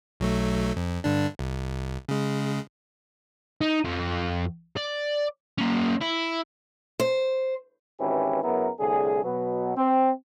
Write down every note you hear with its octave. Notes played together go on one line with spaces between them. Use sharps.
B1 F#3 A3
F2
G2 D3 D4
C2
C#3 G#3
D#4
F2
D5
A#3 C#4
E4
C5
G#1 E3 C#4 E4 G4 B4
F#2 C#3 B3 E4 A#4
C2 A2 D3 G#4
B2 F#3 B3
C4